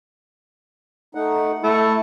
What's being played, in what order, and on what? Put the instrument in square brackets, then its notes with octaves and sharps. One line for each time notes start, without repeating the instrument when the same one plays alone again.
[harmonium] A3 D#4 F#5
[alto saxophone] A3 [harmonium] E4